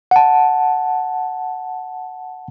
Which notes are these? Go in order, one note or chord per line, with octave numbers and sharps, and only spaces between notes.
F#5 A5